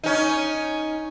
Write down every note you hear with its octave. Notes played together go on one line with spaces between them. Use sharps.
C#4 D#4